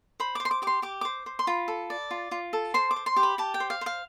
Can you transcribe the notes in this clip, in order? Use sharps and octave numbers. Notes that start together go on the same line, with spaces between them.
C5 B5
D6
C5
C6
D6
G4 D6
C6
G4 D6
C5 D6
C5
C6
F4 B5
A4
D5
F4
F4
A4
C5 C6
D6
C5
C6
G4
B5
G4 A5
G5
C5
F5
C5 F5